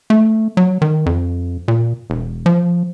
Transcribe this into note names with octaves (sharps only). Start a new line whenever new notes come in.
A3
F#3
D#3
F2
A#2
E1
F3